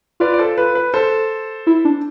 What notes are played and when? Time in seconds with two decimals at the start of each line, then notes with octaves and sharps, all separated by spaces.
0.20 F4 B4 D5
0.34 D5
0.38 A4 C5
0.58 B4
0.75 B4
0.94 A4 C5
1.67 E4
1.85 D4